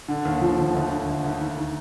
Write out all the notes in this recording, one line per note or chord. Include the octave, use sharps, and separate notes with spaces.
D3
D#2
D3 F3
D#2
D2
D3
D2
D2
D#3
D#3